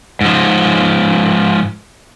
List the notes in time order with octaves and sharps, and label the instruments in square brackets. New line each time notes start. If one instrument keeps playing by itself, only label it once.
[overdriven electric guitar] G#2 F3